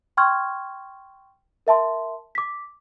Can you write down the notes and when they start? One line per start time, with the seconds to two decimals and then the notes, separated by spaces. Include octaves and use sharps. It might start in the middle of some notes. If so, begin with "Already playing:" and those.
0.17 G5 C6 C#6 F6 G#6
1.67 A#4 E5 A5 C6
2.35 D6 B6